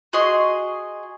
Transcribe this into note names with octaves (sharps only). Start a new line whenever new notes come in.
F#4 G#4 D#5 C6